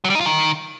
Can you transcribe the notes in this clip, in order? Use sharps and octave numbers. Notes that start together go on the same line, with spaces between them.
F#3
G3
D#4
F4
D#3